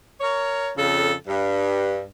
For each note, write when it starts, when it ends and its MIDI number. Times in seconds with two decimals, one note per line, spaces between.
0.21 0.70 70
0.21 0.70 73
0.77 1.13 41
0.77 1.13 49
0.77 1.13 69
1.28 2.07 43